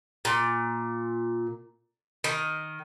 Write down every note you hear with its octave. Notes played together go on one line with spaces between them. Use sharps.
A#2
D#3